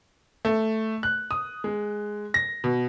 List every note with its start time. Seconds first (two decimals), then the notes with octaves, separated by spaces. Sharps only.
0.45 A3
1.03 F#6
1.31 D#6
1.64 G#3
2.34 A#6
2.64 B2